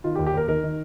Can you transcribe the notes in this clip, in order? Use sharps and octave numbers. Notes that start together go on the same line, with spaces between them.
D#3 F4
G4
D#2
G4
D#2 A#4
D#3 A#4
D#3